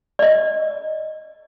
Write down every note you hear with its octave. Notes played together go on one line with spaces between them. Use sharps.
D5 D#5